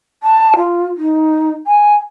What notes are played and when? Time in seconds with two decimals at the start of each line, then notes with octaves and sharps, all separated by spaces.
0.23 A5
0.56 F4
0.97 D#4
1.67 G#5